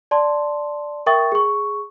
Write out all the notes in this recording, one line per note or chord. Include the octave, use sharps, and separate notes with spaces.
D5 A5 C6
A#4 E5 G5 C#6 D#6 A6
G#4 C#6